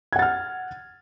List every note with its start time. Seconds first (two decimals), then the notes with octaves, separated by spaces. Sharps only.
0.13 G#6
0.16 F#5
0.19 A6
0.22 F6